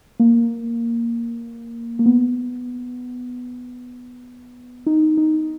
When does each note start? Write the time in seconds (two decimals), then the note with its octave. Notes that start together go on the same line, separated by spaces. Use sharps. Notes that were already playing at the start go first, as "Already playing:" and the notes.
0.20 A#3
1.99 A#3
2.06 B3
4.86 D#4
5.17 D#4